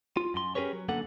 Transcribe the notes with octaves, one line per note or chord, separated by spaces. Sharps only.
F4
F#2 C6
C#4 G4 G#4 A#4 B4 C#5
F#3
F#2 D3 A#3 B3 A4 F#5